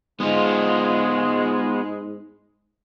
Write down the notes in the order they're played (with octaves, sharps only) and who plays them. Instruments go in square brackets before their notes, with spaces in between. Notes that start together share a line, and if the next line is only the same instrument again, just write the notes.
[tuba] G#2 [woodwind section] G#3 [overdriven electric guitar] B3 F4